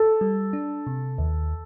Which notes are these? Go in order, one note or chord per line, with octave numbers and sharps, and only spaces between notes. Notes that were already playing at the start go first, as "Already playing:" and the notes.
Already playing: A4
G3
D4
C3
D#2